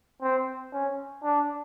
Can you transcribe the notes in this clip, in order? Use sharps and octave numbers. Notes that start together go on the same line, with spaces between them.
C4
C#4
D4